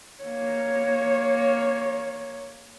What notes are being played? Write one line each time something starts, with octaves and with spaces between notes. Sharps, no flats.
A#3 C#5